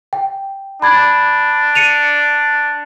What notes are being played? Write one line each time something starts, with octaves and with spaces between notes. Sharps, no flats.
G5
D4 B5 G#6
C#7 D#7 F7